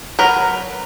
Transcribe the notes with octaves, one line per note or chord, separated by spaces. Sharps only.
F#3 A#4 B4